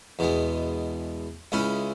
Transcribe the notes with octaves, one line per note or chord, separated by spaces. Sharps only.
E2 B2 G#3
C#2 C#3 G#3 C#4 E4